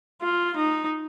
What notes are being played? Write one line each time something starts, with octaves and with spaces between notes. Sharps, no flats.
F4
D#4